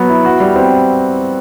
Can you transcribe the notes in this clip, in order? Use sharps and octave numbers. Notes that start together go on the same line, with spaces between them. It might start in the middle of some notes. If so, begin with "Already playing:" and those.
Already playing: F#3 B3
E4
F#4
G3
C4